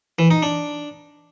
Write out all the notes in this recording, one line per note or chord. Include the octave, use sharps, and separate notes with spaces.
E3
D#4
D4